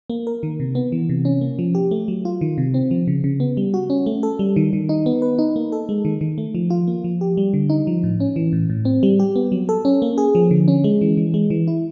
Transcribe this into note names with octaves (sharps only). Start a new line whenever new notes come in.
A#3
A#4
D#3
C3
B3
E3
C3
C#4
A#3
F3
G4
A3
F#3
F4
D#3
C3
C4
F3
C#3
C#3
B3
G3
F#4
C#4
A3
A4
G3
D#3
D#3
D#4
B3
B4
D#4
A#3
A4
G#3
D#3
D#3
A3
F3
F4
A#3
F3
G4
G3
D3
D#4
F3
A2
C#4
E3
A2
A2
C4
G3
G4
B3
F#3
A4
C#4
A#3
G#4
F3
D3
C#4
G#3
E3
E3
G#3
E3
E4